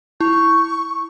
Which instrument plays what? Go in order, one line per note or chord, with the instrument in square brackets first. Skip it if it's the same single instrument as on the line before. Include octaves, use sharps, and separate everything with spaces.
[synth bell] E4 [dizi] C#6